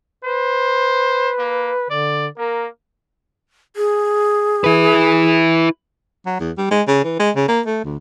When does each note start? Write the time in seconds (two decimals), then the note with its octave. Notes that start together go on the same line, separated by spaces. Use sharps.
0.24 B4 C5
1.38 A#3
1.90 D3 D5
2.38 A#3 A#4
3.76 G#4
4.64 E4 B4
6.26 F#3
6.40 E2
6.58 G3
6.71 G#3
6.88 C#3
7.04 E3
7.20 G#3
7.36 C#3
7.48 A#3
7.66 A3
7.85 D2